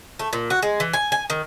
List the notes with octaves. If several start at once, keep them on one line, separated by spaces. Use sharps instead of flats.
A3
A#2
F#4
G#3
E3
G#5
G#5
D#3